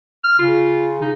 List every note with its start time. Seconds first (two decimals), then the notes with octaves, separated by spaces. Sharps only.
0.24 F6
0.39 C#3 F4
1.02 C#3 D#4